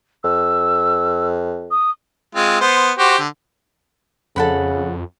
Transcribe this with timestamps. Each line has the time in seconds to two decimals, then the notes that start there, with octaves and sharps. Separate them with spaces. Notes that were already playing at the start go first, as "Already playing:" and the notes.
0.24 F2 E6
1.71 D#6
2.35 G#3 C4 F4
2.61 B3 C5
2.99 F#4 G4 C5
3.19 D3
4.36 F2 C#3 A4 F#5 B5